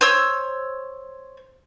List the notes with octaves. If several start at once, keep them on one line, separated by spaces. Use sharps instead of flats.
C5 C#5 E6